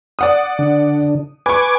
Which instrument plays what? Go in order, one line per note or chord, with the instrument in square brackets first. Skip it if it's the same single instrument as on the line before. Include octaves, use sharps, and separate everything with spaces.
[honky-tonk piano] D5 F#5 D#6
[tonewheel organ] D3
[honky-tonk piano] B4 C#6 [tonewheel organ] G#5 D6